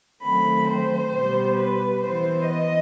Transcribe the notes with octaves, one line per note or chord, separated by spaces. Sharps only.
D#3 F#3 A3 C4 B5
C5
B2 G3 B3
B4
E3 B3 C5
D#5